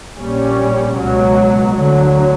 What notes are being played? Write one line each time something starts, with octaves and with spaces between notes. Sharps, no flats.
A#1 A#2 G3 C#4
C#2 B2 F#3
D2 D3 F#3